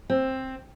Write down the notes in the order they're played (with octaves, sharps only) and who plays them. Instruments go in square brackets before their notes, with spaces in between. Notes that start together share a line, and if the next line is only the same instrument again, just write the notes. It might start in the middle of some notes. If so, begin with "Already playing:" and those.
[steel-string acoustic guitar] C4